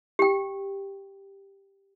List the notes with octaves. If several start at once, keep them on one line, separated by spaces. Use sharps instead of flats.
G4 G5